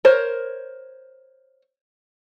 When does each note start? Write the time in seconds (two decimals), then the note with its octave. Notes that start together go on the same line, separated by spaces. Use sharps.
0.05 A#4 C5 C#5